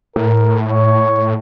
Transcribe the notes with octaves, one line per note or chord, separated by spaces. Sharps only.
A2 A#4
C#5